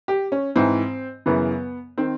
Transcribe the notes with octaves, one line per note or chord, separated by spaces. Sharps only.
G4
C#4
G#2 E3 C4
F#2 C#3 E3 B3
D#3 C4